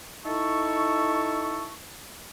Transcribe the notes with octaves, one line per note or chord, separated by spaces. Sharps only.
D#4 E4 A4 E5 A5 C#6